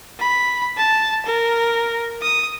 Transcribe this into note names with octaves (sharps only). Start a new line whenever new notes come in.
B5
A5
A#4
D#6